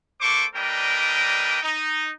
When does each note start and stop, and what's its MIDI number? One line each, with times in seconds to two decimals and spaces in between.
0.21 0.44 58
0.21 0.44 69
0.21 0.44 72
0.21 0.44 85
0.21 0.44 86
0.54 1.57 55
0.54 1.57 62
0.54 1.57 70
0.54 1.57 71
0.54 1.57 75
0.54 1.57 79
1.61 2.10 63